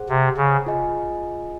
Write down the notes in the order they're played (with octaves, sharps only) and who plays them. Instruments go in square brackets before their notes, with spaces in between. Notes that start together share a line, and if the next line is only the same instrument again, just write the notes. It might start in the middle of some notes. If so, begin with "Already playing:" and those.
Already playing: [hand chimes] G#4 C5 F#5
[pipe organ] C3
C#3
[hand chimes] F4 G#4 D#5 G#5